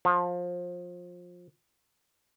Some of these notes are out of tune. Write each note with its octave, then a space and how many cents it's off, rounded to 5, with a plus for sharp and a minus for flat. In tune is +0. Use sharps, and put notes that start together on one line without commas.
F3 +25